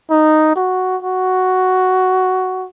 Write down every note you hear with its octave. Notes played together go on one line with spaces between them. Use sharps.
D#4
F#4
F#4